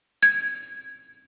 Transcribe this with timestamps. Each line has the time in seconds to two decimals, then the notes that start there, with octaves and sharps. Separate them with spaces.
0.23 G#6